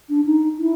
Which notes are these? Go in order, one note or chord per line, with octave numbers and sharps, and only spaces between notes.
D4
D#4
E4